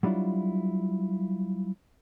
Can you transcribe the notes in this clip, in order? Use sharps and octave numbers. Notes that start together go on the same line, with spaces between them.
F#3 G3 D4 E4 F4